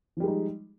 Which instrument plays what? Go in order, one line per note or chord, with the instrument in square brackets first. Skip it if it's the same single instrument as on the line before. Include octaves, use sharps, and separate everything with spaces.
[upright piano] F3
G3
G#3
D#4